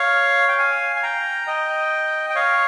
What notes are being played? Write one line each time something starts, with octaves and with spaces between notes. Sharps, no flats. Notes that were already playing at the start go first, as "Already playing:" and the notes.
Already playing: C#5 F5
G5
F5 G#5
G#5
G5 A#5
D#5 G5
G5
C#5 F5